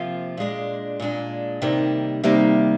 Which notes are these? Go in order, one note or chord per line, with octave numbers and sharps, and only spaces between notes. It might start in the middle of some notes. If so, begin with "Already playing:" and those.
Already playing: C3 F3 A#3 F4
A#2 G#3 D4
A#2 G#3 D4
C3 D#3 G3 A#3
C3 D#3 G3 A#3